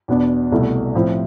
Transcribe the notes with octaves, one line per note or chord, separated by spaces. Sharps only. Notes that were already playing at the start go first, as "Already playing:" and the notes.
E2 B2 B3 D4
C2 B2 A3 E4
A2 F3 C4 E4